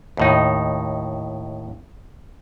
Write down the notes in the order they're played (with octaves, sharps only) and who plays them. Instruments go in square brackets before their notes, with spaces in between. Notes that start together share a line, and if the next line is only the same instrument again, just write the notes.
[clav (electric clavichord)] D#2 A2 D#4